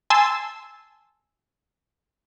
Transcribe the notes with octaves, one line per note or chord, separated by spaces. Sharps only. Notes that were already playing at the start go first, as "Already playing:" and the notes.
G#5 A5 C6 E6